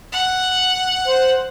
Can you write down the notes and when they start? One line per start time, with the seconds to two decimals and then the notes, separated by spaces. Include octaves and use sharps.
0.12 F#5
1.06 C5